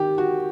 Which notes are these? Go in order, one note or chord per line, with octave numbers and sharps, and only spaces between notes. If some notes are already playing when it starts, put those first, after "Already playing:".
Already playing: D#3 G4
F#4